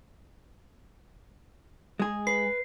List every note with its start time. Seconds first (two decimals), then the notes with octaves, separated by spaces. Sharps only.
2.00 G#3 G#4
2.27 B4 C7